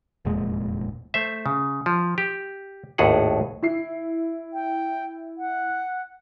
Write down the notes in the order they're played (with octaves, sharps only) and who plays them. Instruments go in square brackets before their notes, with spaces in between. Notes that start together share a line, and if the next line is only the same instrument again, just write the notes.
[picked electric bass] F1 E2 A#2 G#3
[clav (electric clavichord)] A3 C5 E5
C#3
F3
G4
G#1 D#2 A2 G#4 A4 F#5
[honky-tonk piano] E4 C7
[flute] G5
F#5